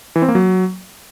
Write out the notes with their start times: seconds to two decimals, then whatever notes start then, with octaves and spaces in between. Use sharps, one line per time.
0.16 E3
0.22 C4
0.28 A#3
0.35 F#3